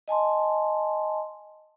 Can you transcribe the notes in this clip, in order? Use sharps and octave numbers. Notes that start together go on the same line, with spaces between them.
D#5 G#5 A5 C6